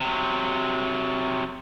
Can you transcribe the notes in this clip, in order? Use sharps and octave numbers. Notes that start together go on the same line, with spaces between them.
C3 F#3